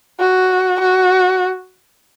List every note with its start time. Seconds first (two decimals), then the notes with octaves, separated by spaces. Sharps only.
0.20 F#4
0.80 F#4